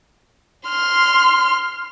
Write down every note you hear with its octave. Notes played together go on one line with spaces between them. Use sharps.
C6 F6